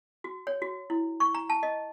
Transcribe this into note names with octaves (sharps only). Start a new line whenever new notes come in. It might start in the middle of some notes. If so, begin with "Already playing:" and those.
F#4
C#5
F#4
E4
C#6
A#5
A5
D#5